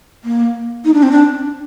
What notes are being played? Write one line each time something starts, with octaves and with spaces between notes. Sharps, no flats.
A#3
D#4
D4
C4
D4